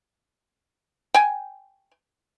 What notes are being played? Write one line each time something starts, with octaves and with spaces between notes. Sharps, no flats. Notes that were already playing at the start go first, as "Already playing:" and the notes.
G5 G#5